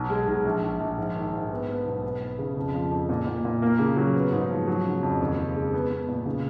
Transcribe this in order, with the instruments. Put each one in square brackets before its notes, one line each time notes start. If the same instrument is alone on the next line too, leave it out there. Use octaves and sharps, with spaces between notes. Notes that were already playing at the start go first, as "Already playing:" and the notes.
Already playing: [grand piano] B1
G#3
B1
A#1
A#1
A#1
G#2
D#3
G#2
B3
B3
B1
B3
B3
C#3
F2
F3
F2
A#2
A#2
A#2
A#3
C#3
F#3
B3
G#2
F3
F#3
C#3
F2
D#2
C#3
G#3
B3
B3
A#2
C#3